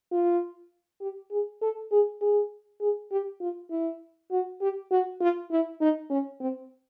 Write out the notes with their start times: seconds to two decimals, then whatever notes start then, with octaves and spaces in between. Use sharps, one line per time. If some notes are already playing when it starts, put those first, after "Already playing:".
0.11 F4
1.01 G4
1.31 G#4
1.61 A4
1.91 G#4
2.21 G#4
2.81 G#4
3.11 G4
3.41 F4
3.70 E4
4.31 F#4
4.61 G4
4.91 F#4
5.21 F4
5.51 E4
5.81 D#4
6.10 C#4
6.40 C4